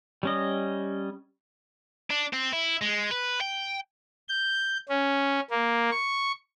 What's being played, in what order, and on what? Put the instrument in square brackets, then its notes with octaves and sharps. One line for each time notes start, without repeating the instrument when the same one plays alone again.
[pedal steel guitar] G3 C#4 D#5
[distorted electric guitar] D4
C4
E4
G#3
B4
G5
[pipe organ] G6
C#4
A#3
C#6